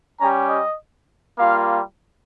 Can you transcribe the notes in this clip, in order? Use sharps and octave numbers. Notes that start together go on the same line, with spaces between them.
G3 C#4 G4 A#5
D#5
G3 A#3 F4 F5